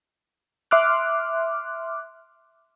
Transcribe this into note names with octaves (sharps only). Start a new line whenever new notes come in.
E5 C6 D6 F6 F#6